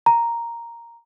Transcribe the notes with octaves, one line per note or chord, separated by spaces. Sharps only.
A#5